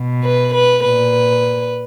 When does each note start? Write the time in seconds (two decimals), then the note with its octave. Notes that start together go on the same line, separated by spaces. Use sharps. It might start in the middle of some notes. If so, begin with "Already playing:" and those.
Already playing: B2
0.23 B4
0.53 B4
0.84 A#2 B4